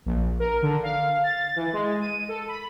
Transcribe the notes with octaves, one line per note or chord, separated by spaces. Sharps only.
A#1
A#4
D3
F5
A6
E3
G#3
D#7
A4
B5